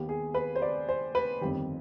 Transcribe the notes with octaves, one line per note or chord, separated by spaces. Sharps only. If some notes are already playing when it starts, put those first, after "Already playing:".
Already playing: D#2 D#3 B3 G4
G#4
B4
C5
D5
C5
B4
G1 F2 D#3 G4